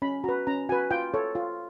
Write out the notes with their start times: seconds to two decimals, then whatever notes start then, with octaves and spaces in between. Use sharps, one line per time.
0.02 C#4 B5
0.24 F#4 B4 A#5
0.47 C#4 A#5
0.69 F#4 B4 G#5
0.91 F4 G5
1.14 A4 C#5
1.35 F4